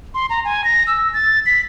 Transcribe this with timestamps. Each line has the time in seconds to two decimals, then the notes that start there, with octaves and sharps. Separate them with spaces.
0.14 C6
0.30 A#5
0.45 G#5
0.64 A#6
0.87 E6
1.14 A6
1.46 B6